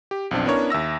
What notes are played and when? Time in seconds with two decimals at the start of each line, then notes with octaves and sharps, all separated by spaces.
0.11 G4
0.31 B1 F2 C4 D4
0.46 B3 C#4 D4 E4 A#4 C#5
0.70 D#2 E5 E6 A#6